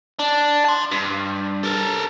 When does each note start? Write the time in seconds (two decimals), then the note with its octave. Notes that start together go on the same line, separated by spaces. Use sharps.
0.19 D4
0.65 A5 C6
0.91 G2
1.63 A4 A#4